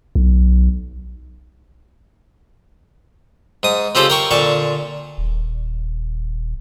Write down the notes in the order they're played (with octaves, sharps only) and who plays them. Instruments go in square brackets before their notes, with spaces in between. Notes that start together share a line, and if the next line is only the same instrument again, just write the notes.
[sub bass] B1
[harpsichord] G#2 D#6
C#3 C4 F4 G4 A4 C5
A#4 G5 C#6
A#2 D3 A5 C#6
[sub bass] D#1